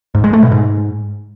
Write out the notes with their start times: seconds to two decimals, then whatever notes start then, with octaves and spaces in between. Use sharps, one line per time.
0.15 G#2
0.24 G#3
0.33 A3
0.42 B2
0.52 G#2